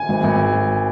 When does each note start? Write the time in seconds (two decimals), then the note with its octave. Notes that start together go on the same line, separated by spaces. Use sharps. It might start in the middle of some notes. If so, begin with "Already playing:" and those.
Already playing: G#5
0.09 G#1
0.24 G#1